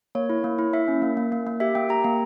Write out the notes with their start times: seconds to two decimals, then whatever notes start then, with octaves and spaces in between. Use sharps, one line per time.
0.15 A#3 C#5
0.29 E4
0.44 A#3
0.59 E4
0.73 E4 E5
0.88 C#4
1.02 A#3
1.17 A#3
1.32 A#3
1.46 A#3
1.60 G4 E5
1.75 A#3 G5
1.89 G4 A#5
2.04 A#3